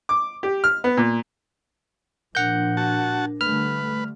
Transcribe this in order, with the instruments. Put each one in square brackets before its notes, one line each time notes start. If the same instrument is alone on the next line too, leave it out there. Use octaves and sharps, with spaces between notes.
[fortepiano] D6
G4
F6
B3
A#2
[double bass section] A#2 F3 [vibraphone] D4 A#4 [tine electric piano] F#5 G6
[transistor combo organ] F#4 A5
[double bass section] D3 G3 A3 [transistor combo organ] B4 [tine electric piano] F6